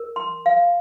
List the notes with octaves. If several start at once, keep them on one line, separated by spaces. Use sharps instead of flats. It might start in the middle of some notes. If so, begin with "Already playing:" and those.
Already playing: A#4
C6
F5